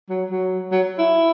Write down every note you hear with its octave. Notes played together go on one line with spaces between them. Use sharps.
F#3
F#3
F#3
E4